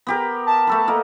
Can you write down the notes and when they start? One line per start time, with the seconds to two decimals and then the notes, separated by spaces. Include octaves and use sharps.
0.07 B3 G4 A#4
0.46 A5
0.67 A3 A4 B4
0.87 A#3 A#4 D#5